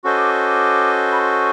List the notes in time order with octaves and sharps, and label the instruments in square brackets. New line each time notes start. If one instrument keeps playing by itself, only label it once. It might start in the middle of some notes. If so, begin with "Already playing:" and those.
[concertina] C#4 F#4 A4 C5 D#5 [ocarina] C#6
[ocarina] D6
C#6
D6
B5
C6
C#6